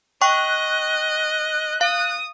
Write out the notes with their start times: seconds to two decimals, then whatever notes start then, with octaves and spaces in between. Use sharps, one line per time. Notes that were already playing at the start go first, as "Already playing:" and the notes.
0.22 D#5 G5 C#6 F#6
1.81 F5 D#6